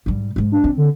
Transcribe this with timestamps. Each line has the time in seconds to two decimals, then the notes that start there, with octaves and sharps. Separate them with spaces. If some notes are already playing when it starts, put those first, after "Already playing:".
0.06 G#2 G3
0.36 G#2 G#3
0.52 D4
0.64 C4
0.77 D3